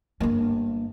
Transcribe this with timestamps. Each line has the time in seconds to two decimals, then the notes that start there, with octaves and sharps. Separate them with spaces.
0.20 G1 A#3